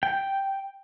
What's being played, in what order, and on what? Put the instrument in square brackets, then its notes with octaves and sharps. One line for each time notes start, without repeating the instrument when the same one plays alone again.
[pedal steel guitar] G5